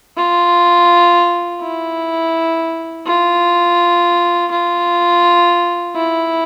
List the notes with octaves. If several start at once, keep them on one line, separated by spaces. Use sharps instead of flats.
F4
E4
F4
F4
E4